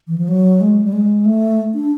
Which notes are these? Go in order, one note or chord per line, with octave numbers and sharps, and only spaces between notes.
E3
F3
F#3
G#3
G3
G#3
A3
D4